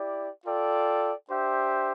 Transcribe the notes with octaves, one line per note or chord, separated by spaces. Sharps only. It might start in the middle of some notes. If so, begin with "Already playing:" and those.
Already playing: E4 G4 D5
F4 A4 D5 G5
D4 G4 C5 E5